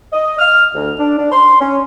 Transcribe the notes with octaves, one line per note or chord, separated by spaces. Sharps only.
D#5
F6
D2
D4
D4
C6
C#4